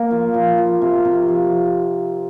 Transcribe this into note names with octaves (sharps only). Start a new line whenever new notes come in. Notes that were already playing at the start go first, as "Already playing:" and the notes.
Already playing: A#3
F3
F3
F3
C3
C3
F3